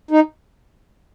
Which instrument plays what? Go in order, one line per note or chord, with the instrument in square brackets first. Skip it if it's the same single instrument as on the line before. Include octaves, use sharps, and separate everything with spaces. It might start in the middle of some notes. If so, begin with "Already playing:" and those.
[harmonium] D#4